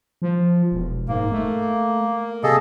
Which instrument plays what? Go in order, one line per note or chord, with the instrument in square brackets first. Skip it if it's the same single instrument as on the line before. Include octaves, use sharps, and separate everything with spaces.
[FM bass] F3
E1
[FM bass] G#2 [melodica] A#3
[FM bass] A3
[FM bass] C3 [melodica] G#4 A4 D#5